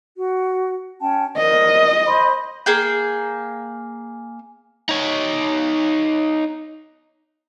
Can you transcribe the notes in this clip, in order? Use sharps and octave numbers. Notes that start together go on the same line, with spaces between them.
F#4
C#4 G5 A5
A#4 C5 D5 D#5
C5 B5 C6
A#3 G#4 G5
D#4 C#5